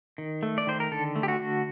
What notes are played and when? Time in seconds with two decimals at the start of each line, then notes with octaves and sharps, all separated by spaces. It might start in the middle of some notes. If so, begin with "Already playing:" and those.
0.18 D#3
0.43 A3
0.58 D5
0.67 D#3 C5
0.80 A#4
0.91 D3 A4
1.16 A3
1.23 G4
1.28 F#4
1.40 D3